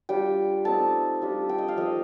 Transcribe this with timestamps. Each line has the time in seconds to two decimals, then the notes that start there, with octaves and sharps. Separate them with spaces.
0.09 G3 D4 F4 G5
0.65 A3 C4 D#4 A5
1.22 G3 D4 F4
1.49 G5
1.58 D#5
1.68 F5
1.77 F3 A3 D#4 D#5